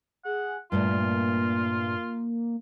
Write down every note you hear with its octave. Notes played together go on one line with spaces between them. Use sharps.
G#4 F#5
G2 A#2 A3 A#3 F4